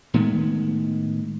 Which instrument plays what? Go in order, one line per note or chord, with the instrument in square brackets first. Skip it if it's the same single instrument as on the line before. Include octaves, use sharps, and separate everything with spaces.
[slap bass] A2 D#3 G#3 B3